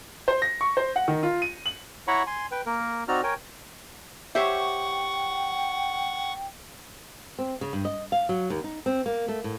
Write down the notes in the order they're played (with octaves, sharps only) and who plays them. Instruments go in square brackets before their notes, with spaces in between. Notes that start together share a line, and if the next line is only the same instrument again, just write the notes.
[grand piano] C5
A#6
C#6
C5
F#5
D#3
F4
D#7
F#7
[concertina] E4 C#5 F#5 A#5 B5 C#6
G#5 C6
B4 G5
A#3 A#4
C4 D#4 F#4 D5 A#5 F6
A#4 C#5 G5 G#5
[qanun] G4 C5 C#5 [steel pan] E5 [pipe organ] F#5 C#6 [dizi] G5
[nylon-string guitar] C4
C#3
G2
D#5
F5
F#3
D#2
D#4
C4
A#3
A3
A2